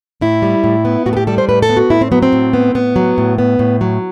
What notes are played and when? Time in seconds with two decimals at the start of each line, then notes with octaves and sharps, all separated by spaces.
0.21 A2 E4
0.42 G3
0.64 A2
0.85 B3
1.06 A2 F#4
1.13 A4
1.17 G4
1.27 G3 A4
1.38 C5
1.49 A2 B4
1.62 A4
1.69 B3
1.77 F#4
1.90 A2 E4
2.01 C4
2.12 F#3 B3
2.23 C4
2.32 A2
2.53 B3
2.75 A2 B3
2.96 F#3
3.18 A2
3.38 B3
3.59 A2
3.81 F#3